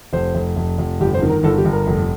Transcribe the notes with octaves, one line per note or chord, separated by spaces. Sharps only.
F1 C5
F1
F1
F1
G1 G4
C5
D#3
A#4
G1 A4
G4
G1
A#4
F1